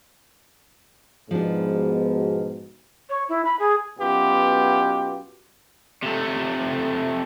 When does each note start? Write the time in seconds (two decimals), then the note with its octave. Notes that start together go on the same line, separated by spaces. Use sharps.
1.31 G#2 B2 F3 D4
3.09 C#5
3.29 E4
3.45 B5
3.59 G#4
3.99 F#2 B2 B3 F4 G4
6.03 C3 A3